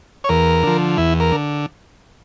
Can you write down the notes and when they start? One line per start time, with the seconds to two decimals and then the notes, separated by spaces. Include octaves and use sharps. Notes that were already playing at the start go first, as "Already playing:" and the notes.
0.24 C#5
0.29 E2 A#4
0.63 D3 F3
0.98 E2 E4
1.20 A#4
1.32 D3